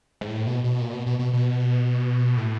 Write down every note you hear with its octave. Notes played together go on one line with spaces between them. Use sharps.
G#2
A2
B2
B2
A#2
B2
B2
B2
B2
A2